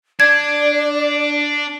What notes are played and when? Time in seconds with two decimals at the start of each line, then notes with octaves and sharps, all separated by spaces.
0.20 D4 D5 G#6